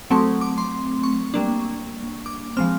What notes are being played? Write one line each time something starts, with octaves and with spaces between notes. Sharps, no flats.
F#3 A3 C4 C#6
D6
C6
C#6
G3 A#3 D4
D6
F3 G#3 C4 F6